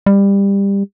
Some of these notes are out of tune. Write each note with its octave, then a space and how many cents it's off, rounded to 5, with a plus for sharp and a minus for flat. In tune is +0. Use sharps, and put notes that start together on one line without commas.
G3 +20